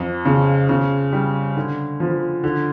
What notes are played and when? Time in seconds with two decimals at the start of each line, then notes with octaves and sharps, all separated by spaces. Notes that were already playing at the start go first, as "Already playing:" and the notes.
Already playing: F2
0.25 C#3
0.69 C#3
1.13 G3
1.57 D3
2.00 F3
2.44 D3